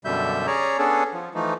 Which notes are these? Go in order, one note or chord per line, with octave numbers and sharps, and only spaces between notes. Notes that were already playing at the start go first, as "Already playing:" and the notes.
F#2 B2 D3 G3 E5 G6
C#4 G#4 C#5 D5 A#5
B3 C#4 D4 G#4 A4
F3
E3 F3 A3 D#4